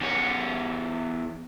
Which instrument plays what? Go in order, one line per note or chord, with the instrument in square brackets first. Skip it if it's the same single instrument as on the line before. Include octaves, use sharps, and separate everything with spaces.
[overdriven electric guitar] E2 C#5